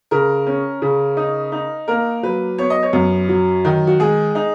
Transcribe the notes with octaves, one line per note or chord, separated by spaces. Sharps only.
C#3 A#4
C#4
C#3
D#4
D#4
A#3 A#4
F#3 B4
B3 C#5
D#5
C#5
F#2
F#3
D#3
F#4
G#3 G#4
D#4